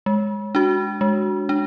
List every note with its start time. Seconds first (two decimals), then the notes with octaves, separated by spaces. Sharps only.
0.06 G#3
0.55 D4 F#4
1.01 G#3
1.49 D4